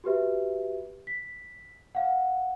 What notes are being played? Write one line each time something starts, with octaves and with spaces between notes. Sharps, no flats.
F#4 G4 B4 E5
B6
F5 F#5